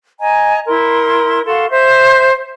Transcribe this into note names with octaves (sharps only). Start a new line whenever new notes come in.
D#5 G#5 A#5
E4 A#4 C6
F#4 A4 F5 C6
C5 E5 G6